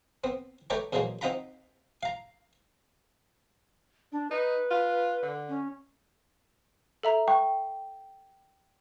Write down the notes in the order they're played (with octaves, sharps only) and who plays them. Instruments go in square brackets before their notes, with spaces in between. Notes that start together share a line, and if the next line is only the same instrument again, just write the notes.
[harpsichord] B3 C4
A3 B4 C#5 D5 G5 A#5
E2 A#2 F3 F#3 G#3 A#3
C4 D#4 F4 F#5 A#5 B5
F5 A#5
[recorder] D4
[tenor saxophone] D#4 [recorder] B4
[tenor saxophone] F4
D3
[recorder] C#4
[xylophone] A4 E5 A#5
[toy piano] G5 [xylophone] C#6